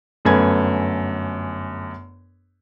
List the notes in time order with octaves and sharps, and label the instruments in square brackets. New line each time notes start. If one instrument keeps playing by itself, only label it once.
[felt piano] G1 F#2 A3 B4 G#5 G#6